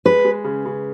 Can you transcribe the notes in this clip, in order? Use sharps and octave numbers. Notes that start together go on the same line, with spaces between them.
G#3 B4
G#3
C#3
C#3